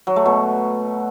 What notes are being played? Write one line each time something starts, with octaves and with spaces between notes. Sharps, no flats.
F#3
A3
B2